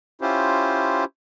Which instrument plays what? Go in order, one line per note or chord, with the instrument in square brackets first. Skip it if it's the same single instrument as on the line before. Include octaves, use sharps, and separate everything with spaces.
[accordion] C#4 E4 F4 G4 C5